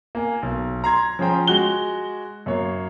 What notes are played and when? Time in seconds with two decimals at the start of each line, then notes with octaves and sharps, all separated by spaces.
0.15 A#3 G#5
0.42 B1
0.84 A#5 C6 G#6
1.19 F3 C#4 G#4 C5 G5 A#5
1.47 G#3 F#4 F#6 G7
2.46 F#2 A#3 C#5